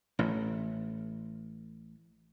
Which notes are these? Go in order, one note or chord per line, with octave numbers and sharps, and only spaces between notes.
A1 A2